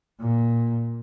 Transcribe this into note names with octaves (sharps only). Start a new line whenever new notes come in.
A#2